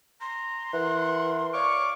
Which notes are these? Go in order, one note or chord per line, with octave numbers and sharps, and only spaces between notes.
A#5 C6
E3 A#4 F#5
C#5 D5 F5 C#6 D6